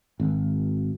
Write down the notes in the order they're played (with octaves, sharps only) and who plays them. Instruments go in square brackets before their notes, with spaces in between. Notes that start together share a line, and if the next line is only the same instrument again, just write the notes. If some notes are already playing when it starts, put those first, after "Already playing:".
[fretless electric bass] G#1